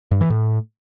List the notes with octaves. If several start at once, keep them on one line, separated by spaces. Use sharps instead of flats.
G2
E3
A2